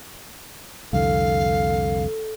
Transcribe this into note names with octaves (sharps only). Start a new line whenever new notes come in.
C2 F2 D3 A4 F5